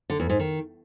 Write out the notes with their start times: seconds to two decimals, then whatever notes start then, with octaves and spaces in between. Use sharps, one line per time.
0.10 D3
0.20 E2
0.30 G#2
0.39 D#3